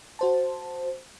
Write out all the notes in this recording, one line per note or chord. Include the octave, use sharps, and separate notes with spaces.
F#4 C5 A5